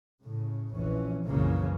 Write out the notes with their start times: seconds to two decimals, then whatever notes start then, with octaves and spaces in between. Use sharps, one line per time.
0.23 A2 C#3
0.74 F1 A#1 E3 C#4
1.25 F#1 C2 A#2 C#3 E3 A#3